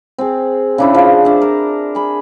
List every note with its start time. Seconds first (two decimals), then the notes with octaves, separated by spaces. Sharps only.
0.18 C4 G#4
0.78 C#3 D4 E4
0.95 F3 C5
1.25 D4 E5
1.42 A#4
1.95 G#4 B5